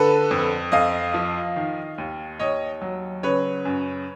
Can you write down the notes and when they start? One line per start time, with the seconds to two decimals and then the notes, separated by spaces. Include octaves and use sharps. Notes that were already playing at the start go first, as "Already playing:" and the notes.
Already playing: D3 A4 B4
0.31 F2
0.72 F2 D#5 F5
1.14 F3
1.56 D#3
1.98 D#2
2.40 D#2 C#5 D#5
2.81 F#3
3.23 C#3 B4 C#5
3.65 F#2